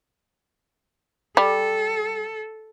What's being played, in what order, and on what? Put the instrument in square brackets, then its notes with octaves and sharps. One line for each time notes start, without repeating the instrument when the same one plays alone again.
[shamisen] G3 [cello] A4